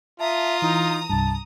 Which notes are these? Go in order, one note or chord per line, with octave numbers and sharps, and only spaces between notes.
F4 E5 A5 A#5 D#6
E3 D#4
C2 G2 A5